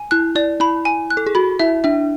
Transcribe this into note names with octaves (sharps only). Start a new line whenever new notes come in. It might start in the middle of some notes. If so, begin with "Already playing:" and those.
Already playing: G#5
E4 F#6
E4 D5
E4 B5
G#5
F#6
A4
G#4
F#4 B5
E4 E5
D4 E5